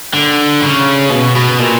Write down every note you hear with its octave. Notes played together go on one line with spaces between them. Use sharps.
D3
C#3
B2
B2
A#2